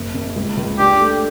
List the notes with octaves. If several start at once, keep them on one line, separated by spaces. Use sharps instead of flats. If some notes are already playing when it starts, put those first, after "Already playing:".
Already playing: F#1
F#1
C#2
C#2
D4 G4
A3